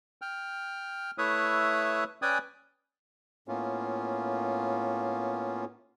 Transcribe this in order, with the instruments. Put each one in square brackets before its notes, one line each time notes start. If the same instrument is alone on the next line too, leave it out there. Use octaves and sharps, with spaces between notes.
[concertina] G5 F6
A3 E4 B4 C#5 E5 D#6
C#4 B4 D5 G5 G#5 D#6
[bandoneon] A2 A#3 B3 C#4 F4